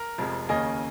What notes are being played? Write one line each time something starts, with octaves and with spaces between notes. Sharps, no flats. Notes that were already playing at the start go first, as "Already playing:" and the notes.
Already playing: A#4
F1 F2 F3 G#3
D#2 C#3 A#3 D#5 G#5